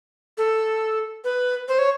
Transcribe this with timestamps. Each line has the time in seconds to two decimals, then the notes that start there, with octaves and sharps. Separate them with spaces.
0.38 A4
1.24 B4
1.68 C5
1.79 C#5